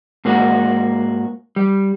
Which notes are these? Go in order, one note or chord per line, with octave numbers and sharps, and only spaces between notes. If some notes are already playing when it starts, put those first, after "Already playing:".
G#2 A#3 F#4
G3